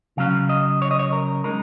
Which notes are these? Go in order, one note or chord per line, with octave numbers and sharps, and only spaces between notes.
C#3 F#3 C#4 F5
D#5
C#5
D#5
C#5
A#4
C#3 G#3 D#4 A#4